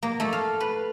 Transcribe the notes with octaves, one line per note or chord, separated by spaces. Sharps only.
A#3
A3
F5
B4